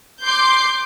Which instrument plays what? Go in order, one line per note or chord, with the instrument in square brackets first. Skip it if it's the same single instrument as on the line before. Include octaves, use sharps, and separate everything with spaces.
[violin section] C6 D6 G6